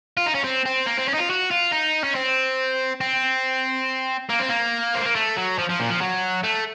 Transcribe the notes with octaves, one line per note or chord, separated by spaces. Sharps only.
F4
D#4
C#4
C4
C4
A#3
C4
C#4
D#4
F4
F#4
F4
D#4
C#4
C4
C4
A#3
C4
A#3
C4
A#3
A3
F#3
F3
F3
A#2
F3
F#3
A3